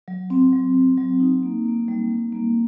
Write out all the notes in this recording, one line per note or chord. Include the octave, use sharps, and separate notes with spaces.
F#3
C4
F#3
F#3
F#3
D#4
A#3
A#3
G3
G3
A#3